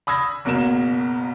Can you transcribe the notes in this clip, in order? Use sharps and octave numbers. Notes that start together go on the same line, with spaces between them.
B5 D#6 E6 G#6 A#6
F#1 B2 A#4 E7